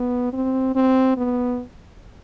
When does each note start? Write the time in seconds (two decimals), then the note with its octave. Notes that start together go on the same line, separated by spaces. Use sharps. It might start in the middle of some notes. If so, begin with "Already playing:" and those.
Already playing: B3
0.33 C4
0.75 C4
1.17 B3